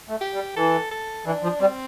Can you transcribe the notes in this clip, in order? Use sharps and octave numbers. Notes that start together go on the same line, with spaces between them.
A3
G4
G3
E3 A4
A4
E3 D4
F3
G3 C4